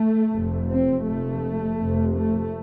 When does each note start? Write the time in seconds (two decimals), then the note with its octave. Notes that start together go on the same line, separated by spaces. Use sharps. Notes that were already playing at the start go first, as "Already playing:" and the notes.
Already playing: A3
0.32 F1 F2 C3
0.69 C4
1.05 F1 F2 C3 A3
1.78 F1 F2 C3
2.15 A3